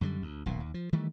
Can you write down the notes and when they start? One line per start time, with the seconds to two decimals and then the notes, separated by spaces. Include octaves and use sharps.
0.01 F#2 D3 E3 G3
0.22 D2
0.46 D#1 B1 A#2
0.60 D#2
0.74 F3
0.93 D#3 E3 G3 A3